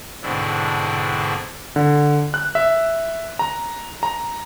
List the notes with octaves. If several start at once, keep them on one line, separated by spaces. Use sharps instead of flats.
G#2 B2 D3 C4 D4 E4
D3
F#6
E5
A#5
A#5